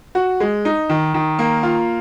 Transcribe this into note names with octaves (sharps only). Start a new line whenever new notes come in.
F#4
G#3
D#4
D#3
D#3
A#3
F4